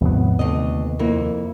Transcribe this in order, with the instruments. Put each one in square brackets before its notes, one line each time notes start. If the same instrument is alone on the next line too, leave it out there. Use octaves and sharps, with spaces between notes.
[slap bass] D#2 B3 [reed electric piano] G#2 C3 F3
[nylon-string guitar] D2 D#5 [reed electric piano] C3
[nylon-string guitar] F2 A#3 E4